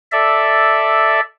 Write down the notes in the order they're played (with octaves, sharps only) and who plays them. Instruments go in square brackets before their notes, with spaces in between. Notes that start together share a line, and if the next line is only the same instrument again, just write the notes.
[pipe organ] A4 D5 E5